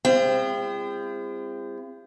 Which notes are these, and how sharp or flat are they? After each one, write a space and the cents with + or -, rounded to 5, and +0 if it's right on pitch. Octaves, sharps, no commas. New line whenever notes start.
G#3 -40 C4 +0 F4 -45